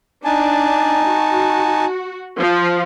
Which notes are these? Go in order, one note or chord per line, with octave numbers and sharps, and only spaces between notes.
D4 D#4 G#5 A5
F#4
F3